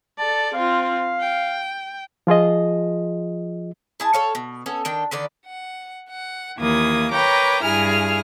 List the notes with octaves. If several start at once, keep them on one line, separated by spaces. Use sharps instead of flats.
A4 D5 A5
C4 F4 F5
G5
F3 F4 G#4 D#5
E4 G#4 A5
A4 C#5 F5
B2
B3 C#4 A4
D#3 D4 G5
D3 D#3 B4 D5
F#5
F#5
D#2 E3 A#3 D#6 G#6
A#4 B4 C#5 G5 A#5 D6
G2 E4 G#4 G#5 F6